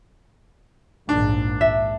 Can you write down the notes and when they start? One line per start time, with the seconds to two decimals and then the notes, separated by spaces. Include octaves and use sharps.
1.09 A#1 D#2 G#2 D4
1.61 E5